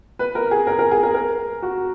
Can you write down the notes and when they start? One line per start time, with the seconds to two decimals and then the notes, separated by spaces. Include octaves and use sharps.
0.19 B4
0.35 A#4
0.51 G#4
0.67 A#4
0.79 A#4
0.91 G#4
1.03 A#4
1.14 A#4
1.62 F#4